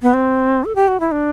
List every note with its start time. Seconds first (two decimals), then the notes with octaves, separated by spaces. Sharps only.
0.02 B3
0.14 C4
0.65 A4
0.75 G4
0.88 F#4
1.00 E4
1.12 D4